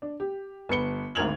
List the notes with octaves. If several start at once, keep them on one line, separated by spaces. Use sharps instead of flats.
D4
G4
G1 B4 C#7 G7
G#1 D2 A#4 G#6 F7 F#7